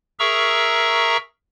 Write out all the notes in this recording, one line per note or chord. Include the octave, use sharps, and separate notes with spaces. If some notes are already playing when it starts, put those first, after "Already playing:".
G#4 A#4 E5 A#5 C#6 E6